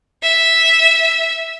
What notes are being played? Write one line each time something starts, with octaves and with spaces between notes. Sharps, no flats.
E5